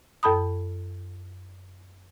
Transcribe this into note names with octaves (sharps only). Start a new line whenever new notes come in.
F#2 A4 A5 B5 D#6